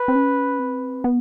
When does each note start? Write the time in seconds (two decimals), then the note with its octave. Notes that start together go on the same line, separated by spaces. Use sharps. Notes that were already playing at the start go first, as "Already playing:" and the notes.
Already playing: B4
0.08 C4
0.15 C#4
0.59 C4
1.04 B3